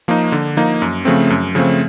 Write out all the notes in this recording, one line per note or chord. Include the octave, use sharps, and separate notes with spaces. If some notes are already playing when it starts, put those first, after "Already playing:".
F3 A#3 D#4
D3
F3 A#3 D#4
F#2
C#3 F3 A3 C4
F#2
C#3 F3 A3 C4